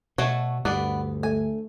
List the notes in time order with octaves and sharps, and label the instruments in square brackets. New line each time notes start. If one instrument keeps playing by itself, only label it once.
[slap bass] B2 [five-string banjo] A3 F#4 C#5
[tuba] D2 [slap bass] G2 [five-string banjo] B3 D5
[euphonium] A3 [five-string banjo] G#5